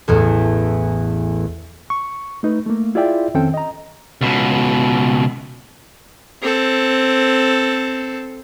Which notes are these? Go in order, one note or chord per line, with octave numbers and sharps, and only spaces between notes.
A1 E2 A2
C#6
A3 D#4 B4
A3 A#3
E4 F4 G#4 D5 E5 G5
F2 D#3 C4 C#4 A4 G5
D#5 A#5
C#2 B2
C4 A4